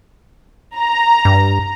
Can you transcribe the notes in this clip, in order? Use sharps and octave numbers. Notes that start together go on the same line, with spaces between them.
A#5
G2